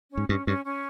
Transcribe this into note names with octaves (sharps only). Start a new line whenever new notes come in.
C#4
G#2
G2 C#4
G2 C#4
C#4